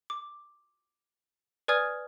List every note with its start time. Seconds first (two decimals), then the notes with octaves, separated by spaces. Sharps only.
0.10 D6
1.68 B4 D5 G#5 D#6 F6 G#6